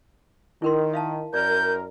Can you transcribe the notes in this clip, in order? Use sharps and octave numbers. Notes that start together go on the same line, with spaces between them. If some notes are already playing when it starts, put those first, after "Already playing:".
D#3 E4 A#4 C6
E5 F5 A5
F#2 A#4 D5 G6